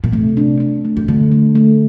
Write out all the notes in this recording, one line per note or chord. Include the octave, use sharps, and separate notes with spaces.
A#2
C3 A3
D4
D4
A3
C3
D3 A3
A3
A3